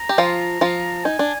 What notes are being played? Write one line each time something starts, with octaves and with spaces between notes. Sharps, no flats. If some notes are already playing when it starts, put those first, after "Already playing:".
Already playing: A#5
G4
F3 F4
F3 F4
D#4 G#5
D4